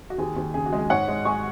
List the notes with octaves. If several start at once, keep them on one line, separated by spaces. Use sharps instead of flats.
F#4
D#2 G#4
D#2
C#3 G#4
F#4
G#3
G#4
G#2 C#5 F#5
G#3
G#3 G#5 C#6